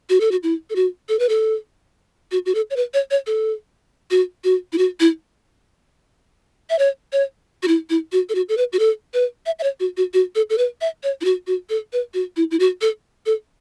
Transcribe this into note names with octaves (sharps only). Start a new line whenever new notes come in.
F#4
A4
F#4
E4
A4
F#4
A4
B4
A4
F#4
F#4
A4
C#5
B4
C#5
C#5
A4
F#4
F#4
E4
F#4
E4
E5
C#5
C#5
F#4
E4
E4
F#4
A4
F#4
A4
B4
F#4
A4
B4
E5
E5
C#5
F#4
F#4
F#4
A4
A4
B4
E5
C#5
E4
F#4
F#4
A4
B4
F#4
E4
E4
F#4
A4
A4